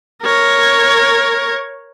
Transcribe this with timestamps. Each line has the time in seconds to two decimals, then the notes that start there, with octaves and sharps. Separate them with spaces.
0.23 A#4 C#5